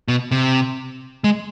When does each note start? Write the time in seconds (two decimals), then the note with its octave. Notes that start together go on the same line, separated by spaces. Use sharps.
0.08 B2
0.31 C3
1.24 G#3